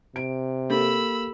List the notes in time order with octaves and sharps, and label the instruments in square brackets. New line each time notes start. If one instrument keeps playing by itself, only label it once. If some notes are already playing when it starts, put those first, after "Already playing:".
[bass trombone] C3 [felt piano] D7
[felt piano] A#3 [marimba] G4 A4 [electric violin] B5 E6